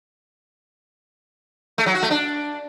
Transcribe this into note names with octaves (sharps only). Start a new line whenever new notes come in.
A3
F#3
F#4
A3
D4